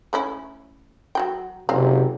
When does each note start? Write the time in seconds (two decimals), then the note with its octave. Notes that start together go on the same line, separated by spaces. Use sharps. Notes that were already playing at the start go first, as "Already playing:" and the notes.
0.13 A3 C#4 E4
1.15 F#3 F#4 G5
1.69 F#1 C3 C4 F5